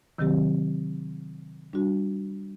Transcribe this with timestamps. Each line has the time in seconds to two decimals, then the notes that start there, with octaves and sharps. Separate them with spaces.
0.18 C3 D#3 F#3 C4 G4
1.73 G3 D4 F#4